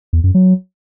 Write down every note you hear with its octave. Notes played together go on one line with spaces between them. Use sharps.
E2
F#2
F#3